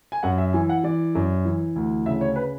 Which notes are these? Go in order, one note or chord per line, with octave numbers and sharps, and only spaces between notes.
G#5
F#2 F#5
E5
E3 G#5
F#5
E3 D5
F#2
E3
D2
C#3 E5
C#5
B4